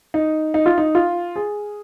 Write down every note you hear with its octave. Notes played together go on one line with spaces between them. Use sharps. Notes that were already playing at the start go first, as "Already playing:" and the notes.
D#4
D#4
F4
D#4
F4
G#4